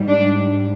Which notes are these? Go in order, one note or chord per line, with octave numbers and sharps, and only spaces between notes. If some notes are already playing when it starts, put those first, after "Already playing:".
Already playing: G#2 G3
D4